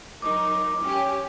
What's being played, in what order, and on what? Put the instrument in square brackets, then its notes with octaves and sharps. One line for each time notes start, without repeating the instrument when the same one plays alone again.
[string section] F#3 D#4 A#4 [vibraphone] D6
[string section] C#4 G4